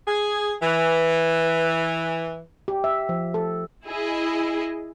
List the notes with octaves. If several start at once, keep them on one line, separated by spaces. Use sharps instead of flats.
G#4
E3
G4
E5
F3
A4
E4 G#4 D#5